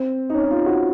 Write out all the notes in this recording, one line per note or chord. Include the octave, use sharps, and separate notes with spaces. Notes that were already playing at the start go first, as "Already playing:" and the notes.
Already playing: C4
D#4
C#4
D#4
F4
F#4